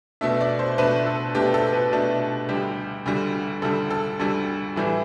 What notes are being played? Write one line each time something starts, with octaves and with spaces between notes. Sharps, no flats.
B2 A3 D4 E5
D5
C5
B2 A3 D4 B4
A4
B2 A3 D4 G4
A4
B4
B2 A3 D4
D2 D3 G3 G4
D2 D3 G3
D2 D3 G3 A4
A4
D2 D3 G3 A4
A2 E3 G3